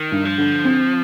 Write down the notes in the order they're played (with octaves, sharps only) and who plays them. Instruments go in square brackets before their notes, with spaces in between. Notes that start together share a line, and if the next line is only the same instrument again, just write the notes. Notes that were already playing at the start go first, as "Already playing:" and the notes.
Already playing: [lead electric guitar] D#3
[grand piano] G2
[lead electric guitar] F3
[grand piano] D3
C4